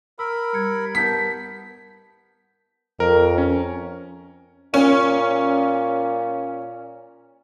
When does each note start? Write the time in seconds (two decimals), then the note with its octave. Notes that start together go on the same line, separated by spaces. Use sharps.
0.19 A#4 B5 E6
0.54 G3 G#6 C#7
0.95 B3 A#4 A5 G6 B6
3.00 F2 A#4
3.38 C#4
4.74 A#2 C#4